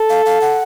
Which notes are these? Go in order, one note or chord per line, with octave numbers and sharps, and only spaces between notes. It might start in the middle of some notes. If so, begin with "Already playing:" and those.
Already playing: A4
F5
F5
F#5